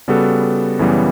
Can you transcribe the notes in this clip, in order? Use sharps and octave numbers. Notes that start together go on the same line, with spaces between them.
C#3 G3 B3 F#4 A4
F#2 C#3 E3 G3 B3